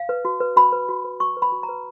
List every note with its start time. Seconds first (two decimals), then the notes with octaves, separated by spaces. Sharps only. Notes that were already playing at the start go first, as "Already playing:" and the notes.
Already playing: F5
0.09 B4
0.25 F#4
0.40 B4
0.56 F#4 B5
0.72 B4
0.89 F#4
1.04 B4
1.20 F#4 C#6
1.37 B4
1.42 B5
1.52 F#4
1.63 A#5
1.69 B4